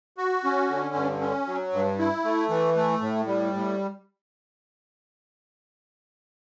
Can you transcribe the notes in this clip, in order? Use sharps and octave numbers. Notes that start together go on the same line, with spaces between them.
F#4
C#4
D3
G2
C#4
F#3
G2
E4
A3
E3
A3
A2
G3
A2